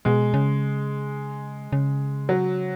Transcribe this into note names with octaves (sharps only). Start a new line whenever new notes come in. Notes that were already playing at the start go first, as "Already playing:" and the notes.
B2 G#3
C#3
C#3
F#3